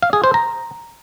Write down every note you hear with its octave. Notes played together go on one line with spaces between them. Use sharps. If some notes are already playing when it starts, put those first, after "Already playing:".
F5
G#4
C5
A#5